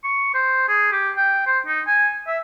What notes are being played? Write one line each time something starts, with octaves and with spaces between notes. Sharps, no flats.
C#6
C5
G#4
G4
G5
C5
D#4
G#5
E5